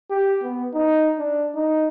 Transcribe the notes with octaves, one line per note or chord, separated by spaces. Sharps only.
G4
B3
D#4
D4
D#4